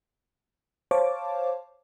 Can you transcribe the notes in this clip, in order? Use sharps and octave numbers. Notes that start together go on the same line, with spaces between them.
C5 C#5 F5 A5 D6